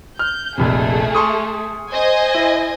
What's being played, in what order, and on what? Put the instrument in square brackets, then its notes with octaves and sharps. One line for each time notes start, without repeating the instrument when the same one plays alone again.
[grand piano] F6 [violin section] G6
[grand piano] F1 A#1 C3 [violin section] A3 G#4
[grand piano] C6 C#6 D#6
[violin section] C5 D#5 G#5
[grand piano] E4